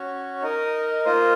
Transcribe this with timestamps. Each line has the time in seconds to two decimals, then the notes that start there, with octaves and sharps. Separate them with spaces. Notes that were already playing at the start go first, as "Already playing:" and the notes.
Already playing: C#4 F#4 C#5
0.42 D#4 A#4 D#5
1.05 A#3 F4 C5 D#5